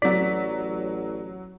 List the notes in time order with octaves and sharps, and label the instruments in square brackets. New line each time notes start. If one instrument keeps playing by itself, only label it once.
[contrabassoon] A1 [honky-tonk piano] F#3 B6 [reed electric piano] D5